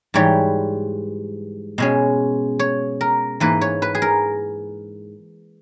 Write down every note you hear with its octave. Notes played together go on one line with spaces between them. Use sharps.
G#2 E3 G3 C#5
B2 G#3 C#4
C#5
A#4
G#2 E3 A#3 B4
C#5
B4
G#4
A#4